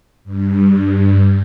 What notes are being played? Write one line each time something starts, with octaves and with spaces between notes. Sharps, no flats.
G2